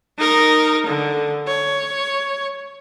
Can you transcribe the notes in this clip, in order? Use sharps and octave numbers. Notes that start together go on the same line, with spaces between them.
D#4 A#4
D3
C#5